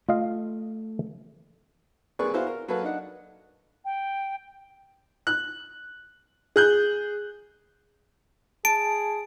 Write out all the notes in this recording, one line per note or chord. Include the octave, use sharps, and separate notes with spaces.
A3 F4 D#5 F5
C2 A#3 G#4 B4 D5 C#6
B3 E4 F#4 G#4 C5 F5
A#4
F#3 A#3 A4 B4 F5
D4 D#4 F#5
G5
F#6
G#4 F#6 G6
G#4 A5 D7